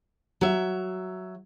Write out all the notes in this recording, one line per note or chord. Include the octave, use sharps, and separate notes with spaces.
F#3 E5